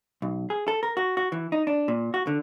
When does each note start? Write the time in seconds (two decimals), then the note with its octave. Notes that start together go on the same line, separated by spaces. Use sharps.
0.22 B1
0.50 G#4
0.68 A4
0.83 A#4
0.97 F#4
1.17 F#4
1.32 E3
1.52 D#4
1.67 D4
1.88 A#2
2.14 F#4
2.27 D3